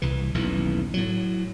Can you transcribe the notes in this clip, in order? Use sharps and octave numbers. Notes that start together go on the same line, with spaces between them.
C2 E3
D#1 B1 E2 E3
A2 F#3